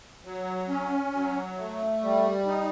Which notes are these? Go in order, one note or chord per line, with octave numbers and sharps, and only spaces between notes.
F#3
C#4
F#3
A3
G3
D#4